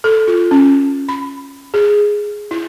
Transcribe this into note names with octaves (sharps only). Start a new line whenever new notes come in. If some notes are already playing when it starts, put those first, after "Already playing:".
A4
F4
C#4
B5
G#4
E4